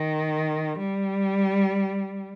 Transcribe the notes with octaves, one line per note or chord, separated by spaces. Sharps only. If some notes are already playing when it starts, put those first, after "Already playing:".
Already playing: D#3
G3